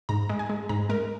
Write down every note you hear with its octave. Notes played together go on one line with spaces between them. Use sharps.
G#2 A#5
G#3
G#5
G#3
G#2 A#5
G#3 A#4